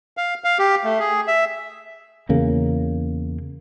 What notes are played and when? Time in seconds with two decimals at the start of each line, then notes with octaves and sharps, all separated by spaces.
0.17 F5
0.44 F5
0.59 G4
0.84 A3
1.00 G#4
1.28 E5
2.29 E2 C#3 A#3